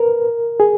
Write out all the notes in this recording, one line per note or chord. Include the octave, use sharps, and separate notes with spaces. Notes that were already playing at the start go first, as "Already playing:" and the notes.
Already playing: A#4 B4
G#4